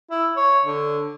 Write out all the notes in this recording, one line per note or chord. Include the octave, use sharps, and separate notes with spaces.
E4
C#5
D3